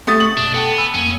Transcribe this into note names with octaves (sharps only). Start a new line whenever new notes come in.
A3 G4 D#6 A6
G1 C#6 F#7
B1 F#2 B2 D4
B3 A4 G5 A5
G#5 B5 E6
F2 A#3 C#4